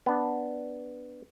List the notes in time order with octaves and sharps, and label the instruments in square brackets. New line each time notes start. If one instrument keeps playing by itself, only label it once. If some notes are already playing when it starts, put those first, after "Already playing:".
[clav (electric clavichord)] B3 D4